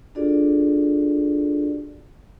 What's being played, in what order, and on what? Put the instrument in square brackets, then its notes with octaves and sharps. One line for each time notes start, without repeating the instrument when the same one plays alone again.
[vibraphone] D4 F4 F#4 G#4 A4 D5